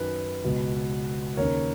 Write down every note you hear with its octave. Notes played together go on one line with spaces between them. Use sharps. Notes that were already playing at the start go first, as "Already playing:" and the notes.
Already playing: F#2 D#3 B4
C#2 B2
D#2 C#3 A#4 C#5